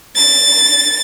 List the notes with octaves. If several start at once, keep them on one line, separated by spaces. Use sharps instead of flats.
A6